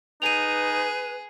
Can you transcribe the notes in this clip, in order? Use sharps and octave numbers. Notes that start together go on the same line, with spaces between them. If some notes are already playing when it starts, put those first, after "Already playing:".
D#4 G#4 B4 D#7 F7